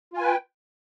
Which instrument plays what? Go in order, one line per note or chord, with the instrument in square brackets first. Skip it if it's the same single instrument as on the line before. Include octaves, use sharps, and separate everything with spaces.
[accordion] F4
G#5
B4
G5